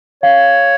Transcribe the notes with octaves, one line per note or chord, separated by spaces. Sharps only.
C#5 F5